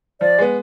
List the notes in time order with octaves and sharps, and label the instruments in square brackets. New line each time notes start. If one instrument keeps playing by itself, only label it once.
[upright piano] F3 [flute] D5
[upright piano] G#3 B3